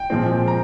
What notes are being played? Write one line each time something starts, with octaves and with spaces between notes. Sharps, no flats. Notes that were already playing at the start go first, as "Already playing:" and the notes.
Already playing: G5
A#2 F3 G#3 C4
A#5